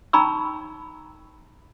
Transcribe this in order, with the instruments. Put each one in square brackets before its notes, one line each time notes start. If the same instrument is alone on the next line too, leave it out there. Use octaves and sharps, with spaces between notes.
[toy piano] D#4 G5 A#5 B5 C#6 E6